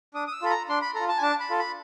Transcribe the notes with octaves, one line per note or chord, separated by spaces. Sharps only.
D4 D#6
D#6
E6
F4 A4 B5
A#5
D4 C6
B5
F4 A4 A#5
A5
G#5
D4 A5
B5
F4 A4
B5